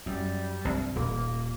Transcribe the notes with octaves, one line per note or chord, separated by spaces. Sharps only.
F#2 G3
C2 G2
D#1 A#3